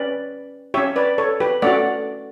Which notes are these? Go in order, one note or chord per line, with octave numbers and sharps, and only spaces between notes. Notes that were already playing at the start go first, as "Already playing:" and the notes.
Already playing: C#4 G4 B4 D5
C#4 G4 C#5 E5
B4 D5
A4 C#5
G4 B4
A3 C#4 F#4 D5 F#5